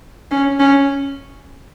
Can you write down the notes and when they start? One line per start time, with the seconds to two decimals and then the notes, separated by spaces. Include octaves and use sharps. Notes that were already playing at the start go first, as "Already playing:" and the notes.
0.31 C#4
0.59 C#4